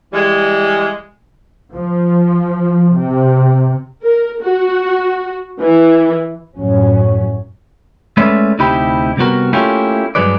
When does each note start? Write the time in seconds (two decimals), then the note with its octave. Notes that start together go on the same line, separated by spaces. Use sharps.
0.13 E3 G3 G#3
1.74 F3
2.97 C3
4.03 A#4
4.42 F#4
5.59 E3
6.56 F#2 A2 F#3 C#4
8.17 G#3 A3 C#4 B4 D5 E5
8.59 D2 C3 D#4 E4 G4 B5
9.17 C3 G3 B3 F#4 A#4
9.53 A3 A#3 C#4 E4 F4 G4
10.15 G2 B2 F#3 G#3 B4 D5